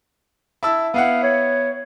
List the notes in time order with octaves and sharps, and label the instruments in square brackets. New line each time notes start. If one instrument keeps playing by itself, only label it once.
[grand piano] E4 A5 E6
[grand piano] B3 E4 F#5 [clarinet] F5
[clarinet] C#5